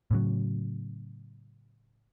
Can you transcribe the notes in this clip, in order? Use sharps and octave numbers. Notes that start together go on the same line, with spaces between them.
A2 C#3 F#3